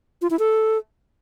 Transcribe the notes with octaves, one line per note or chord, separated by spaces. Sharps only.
F4
E4
A4